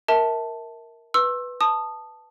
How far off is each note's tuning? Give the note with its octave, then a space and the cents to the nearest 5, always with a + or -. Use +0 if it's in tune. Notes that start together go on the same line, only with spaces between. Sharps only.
A#4 +0 E5 -30 A5 +0
B4 +0 C6 +40 E6 +5
A5 +0 D#6 -15